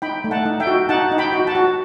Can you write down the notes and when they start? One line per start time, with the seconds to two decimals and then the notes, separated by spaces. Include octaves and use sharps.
0.02 D#4 G5 B5
0.24 A3
0.31 F#5 A5
0.45 D#4
0.60 E5 G5
0.67 F#4
0.89 D#4 F#5 A5
1.12 D#4
1.18 G5 B5
1.32 F#4
1.47 F#5 A5
1.55 F#4